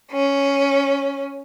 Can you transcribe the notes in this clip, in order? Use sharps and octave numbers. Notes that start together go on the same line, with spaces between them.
C#4